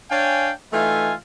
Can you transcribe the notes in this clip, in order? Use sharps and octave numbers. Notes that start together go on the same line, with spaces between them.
D4 C#5 F5 G5 G#5
E3 A3 D#4 F4 E5 G#5